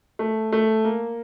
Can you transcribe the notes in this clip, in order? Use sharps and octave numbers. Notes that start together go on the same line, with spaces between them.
A3
A3
A#3